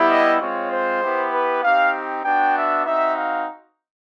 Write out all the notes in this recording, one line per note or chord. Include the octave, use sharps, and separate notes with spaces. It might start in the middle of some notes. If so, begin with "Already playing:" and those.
Already playing: G3 B3 E4 G4
D#5
G#3 C4 F4 C#5
C5
B3 E4 G4
B4
C4 D#4 G4 F5
B3 D4 F#4 G5
E5
C4 D#4 F#4 E5
F5